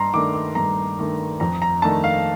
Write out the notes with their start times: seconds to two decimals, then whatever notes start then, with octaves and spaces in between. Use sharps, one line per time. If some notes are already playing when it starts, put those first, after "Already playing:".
Already playing: G2 A#5 C6
0.14 D#3 A3 D4 D6
0.34 D6
0.55 G2 A#5
0.99 D#3 A3 D4
1.40 F2 A#5
1.62 A#5
1.82 D#3 A3 D4 A5
2.04 F5